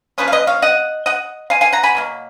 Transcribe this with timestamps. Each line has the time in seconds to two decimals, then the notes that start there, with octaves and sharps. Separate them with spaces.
0.18 F3 A#3 C#4 G#4 B4
0.28 F5
0.32 B4 D#5
0.47 C#5 F5
0.62 D#5 F#5
1.06 D#5 F#5
1.50 F5 G#5
1.61 F5 G#5
1.72 F#5 A#5
1.83 G#5 B5
1.95 B2 F#3 A#3